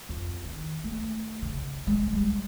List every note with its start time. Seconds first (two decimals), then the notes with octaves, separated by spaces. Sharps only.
0.09 F2
0.46 D#3
0.84 A3
1.42 C#3
1.87 G#3
2.13 G3